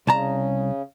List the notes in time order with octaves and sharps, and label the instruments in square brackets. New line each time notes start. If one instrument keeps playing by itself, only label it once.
[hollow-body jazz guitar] C2 A5 A#5 [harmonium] C#3